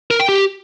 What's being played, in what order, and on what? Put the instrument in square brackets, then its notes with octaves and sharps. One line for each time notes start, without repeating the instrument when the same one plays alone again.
[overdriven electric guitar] A#4
G5
G4